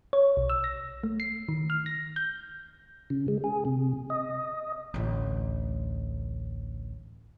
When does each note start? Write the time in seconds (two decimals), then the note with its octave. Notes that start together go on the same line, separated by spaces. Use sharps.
0.13 C#5
0.37 B1
0.50 E6
0.64 A#6
1.04 A3
1.20 C7
1.49 D#3
1.70 F6
1.86 A#6
2.16 G6
3.10 C#3
3.28 G#3
3.44 G#4
3.65 C3
4.10 D#5
4.94 A1 D2